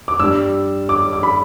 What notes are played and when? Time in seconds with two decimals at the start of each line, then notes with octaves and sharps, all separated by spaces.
0.08 D6
0.20 G2 G3 E6
0.89 D6
1.13 D6
1.23 B5